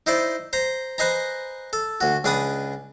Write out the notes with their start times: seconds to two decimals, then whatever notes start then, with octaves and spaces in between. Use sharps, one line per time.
0.07 D#4 E4 C5 D5
0.53 C5 A#5
0.98 B4 C5 D#5 G#5 A#5
1.73 A4
2.01 D2 F#4
2.24 C#2 D4 G#4 B4 B5 D#6